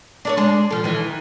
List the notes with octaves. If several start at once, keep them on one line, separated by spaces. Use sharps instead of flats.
D4 A4 C#5
G#3 D4
F3 A4
D#3 E3